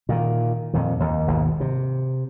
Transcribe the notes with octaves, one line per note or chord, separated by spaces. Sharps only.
A#2 D3 D#3
F2 A#2 D#3
D#2
G#1 D#2 B2
C3